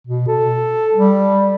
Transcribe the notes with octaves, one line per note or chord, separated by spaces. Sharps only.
B2
A4
G3